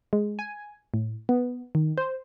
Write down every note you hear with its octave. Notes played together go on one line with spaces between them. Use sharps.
G#3
G#5
A2
B3
D#3
C5